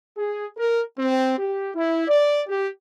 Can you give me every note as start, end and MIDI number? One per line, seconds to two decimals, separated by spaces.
0.17 0.46 68
0.57 0.82 70
0.98 1.37 60
1.38 1.71 67
1.75 2.07 64
2.08 2.42 74
2.48 2.68 67